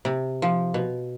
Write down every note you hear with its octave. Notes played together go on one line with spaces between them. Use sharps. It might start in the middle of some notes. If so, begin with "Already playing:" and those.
C3
F3
B2